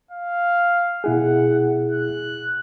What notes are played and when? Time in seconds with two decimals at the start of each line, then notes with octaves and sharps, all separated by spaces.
0.11 F5
1.04 B2 E4 G#4 F#5
1.91 F#6